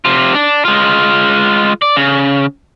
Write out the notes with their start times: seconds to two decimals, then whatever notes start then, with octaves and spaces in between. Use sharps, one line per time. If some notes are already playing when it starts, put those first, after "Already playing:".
0.05 C3 F4
0.34 D4
0.65 G#3 F4
1.82 D5
1.96 C#3